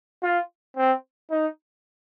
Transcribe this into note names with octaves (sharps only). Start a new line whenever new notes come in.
F4
C4
D#4